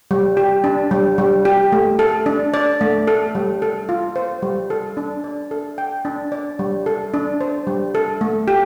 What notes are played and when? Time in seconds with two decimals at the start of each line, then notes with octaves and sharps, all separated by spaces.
0.11 G3
0.37 G4
0.64 D4
0.91 G3
1.18 G3
1.45 G4
1.72 A3
1.99 A4
2.26 D4
2.54 D5
2.81 A3
3.07 A4
3.35 G3
3.62 A4
3.89 F4
4.16 C5
4.43 G3
4.70 A4
4.97 D4
5.24 D5
5.51 A4
5.78 G5
6.05 D4
6.32 D5
6.59 G3
6.86 A4
7.14 D4
7.41 C5
7.67 G3
7.95 A4
8.21 A3
8.48 G4